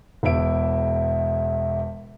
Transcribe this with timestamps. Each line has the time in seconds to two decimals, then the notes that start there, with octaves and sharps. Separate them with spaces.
0.23 E1 E2 E4 E5 D7